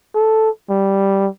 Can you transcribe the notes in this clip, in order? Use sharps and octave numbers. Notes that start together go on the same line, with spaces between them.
A4
G3